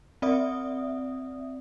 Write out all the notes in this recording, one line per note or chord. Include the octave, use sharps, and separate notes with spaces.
C4 D5 E5 D#6